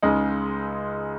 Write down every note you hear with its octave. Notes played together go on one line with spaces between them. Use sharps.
C#2 C#3 G#3 D#4